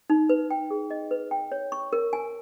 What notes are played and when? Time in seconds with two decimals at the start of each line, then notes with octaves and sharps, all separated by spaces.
0.10 D#4
0.29 B4
0.51 G5
0.71 G#4
0.91 D#5
1.11 B4
1.31 G5
1.52 C#5
1.72 C#6
1.93 A#4
2.13 G#5